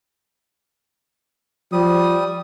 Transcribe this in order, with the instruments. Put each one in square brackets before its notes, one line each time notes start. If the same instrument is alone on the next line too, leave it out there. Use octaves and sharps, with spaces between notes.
[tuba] F3 [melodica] G3 D#6